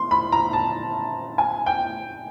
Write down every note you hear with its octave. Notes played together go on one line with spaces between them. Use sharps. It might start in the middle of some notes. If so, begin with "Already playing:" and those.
Already playing: C6
B5
A#5
A5
G#5
G5